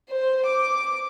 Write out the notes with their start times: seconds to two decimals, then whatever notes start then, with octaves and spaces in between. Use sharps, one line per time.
0.10 C5
0.47 D6